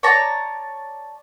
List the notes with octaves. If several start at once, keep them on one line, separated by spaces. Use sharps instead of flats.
C#5 D5 A5 A#5